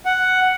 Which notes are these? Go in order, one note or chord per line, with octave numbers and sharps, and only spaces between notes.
F#5